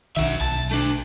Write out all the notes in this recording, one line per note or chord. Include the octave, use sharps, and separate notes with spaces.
B1 D#3 F#4 E5
B1 A5
A3 D4